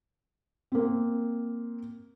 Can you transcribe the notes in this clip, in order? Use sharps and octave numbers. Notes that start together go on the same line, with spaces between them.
A#3 C4